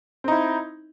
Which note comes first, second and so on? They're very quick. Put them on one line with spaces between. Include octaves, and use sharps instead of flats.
C4 D#4 E4